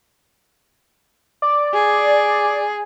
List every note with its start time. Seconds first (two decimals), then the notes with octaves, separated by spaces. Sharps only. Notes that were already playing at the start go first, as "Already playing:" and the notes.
1.42 D5
1.74 G#4